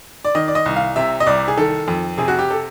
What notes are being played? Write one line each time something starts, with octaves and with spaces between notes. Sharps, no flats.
D5
D#3 D#5
D5
D#5
C2
F5
C3 E5
D#5
C2 D5
G#4
D#3 A4
F2
C3 G#4
F#4
G4
A4